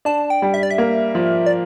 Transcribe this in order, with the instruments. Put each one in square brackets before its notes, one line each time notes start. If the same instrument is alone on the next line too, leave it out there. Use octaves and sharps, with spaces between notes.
[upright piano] D4 [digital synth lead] A5
[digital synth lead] G5
[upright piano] G3
[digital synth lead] E5
D5
E5
[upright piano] A#3
F3
[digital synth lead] D5